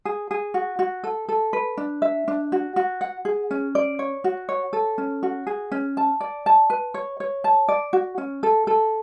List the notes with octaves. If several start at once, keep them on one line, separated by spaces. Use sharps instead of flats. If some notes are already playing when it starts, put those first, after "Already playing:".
G#4
G#4
F#4
F#4
A4
A4
B4
D4
E5
D4
F#4
F#4
F#5
G#4
C#4
D5
C#5
F#4
C#5
A4
C#4
F#4
G#4
C#4
A5
D5
A5
B4
C#5
C#5
A5
D5
F#4
C#4
A4
A4